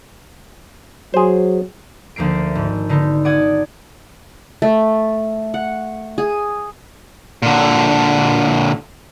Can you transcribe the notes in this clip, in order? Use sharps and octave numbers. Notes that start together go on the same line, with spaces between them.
F#3 G#4 C5
D2 F3 A#3 C7 D7
G#1
D3 B3 D#4
D5 F#5 D#6 G#6
A3
F#5
G#4
A#2 D3